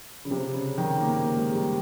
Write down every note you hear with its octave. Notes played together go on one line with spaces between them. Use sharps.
C#3
C3
C#3
D#3
A#3
A#3
G#3
G3